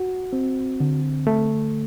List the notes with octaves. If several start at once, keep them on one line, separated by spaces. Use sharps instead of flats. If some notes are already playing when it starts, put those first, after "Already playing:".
Already playing: F#4
C4
D3
A3